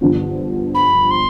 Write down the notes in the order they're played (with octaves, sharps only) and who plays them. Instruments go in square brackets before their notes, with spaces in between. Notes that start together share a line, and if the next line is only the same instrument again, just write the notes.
[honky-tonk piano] G2 D3 F3 B3
[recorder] B5
C6